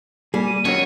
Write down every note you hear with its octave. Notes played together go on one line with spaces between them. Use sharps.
G3 A#3 G#4
D#7
D#3 F#3 C#4 F#4 C#5